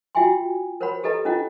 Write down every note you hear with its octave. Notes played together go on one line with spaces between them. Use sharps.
F4 F#4 E5 G5 G#5 C6
A#4 C5 C#5 F#5 B5 C6
G4 A4 B4 D#5 A#5
C#4 D4 E4 F4 D#5 F#5